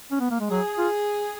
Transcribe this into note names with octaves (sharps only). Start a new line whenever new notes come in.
C#4
B3
A#3
G#3
F#3 G#4
F4